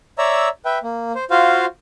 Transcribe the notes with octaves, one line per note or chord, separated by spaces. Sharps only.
C#5 D5 E5 A#5 E6
B4 E5 G5
A#3
C5
F4 F#4 C5 F5